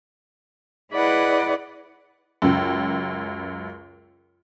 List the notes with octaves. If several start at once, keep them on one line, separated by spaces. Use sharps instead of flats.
E4 G#4 B4 D5 D#5 F#5
C#2 F#2